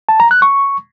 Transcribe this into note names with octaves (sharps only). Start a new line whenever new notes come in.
A5
A#5
F#6
C#6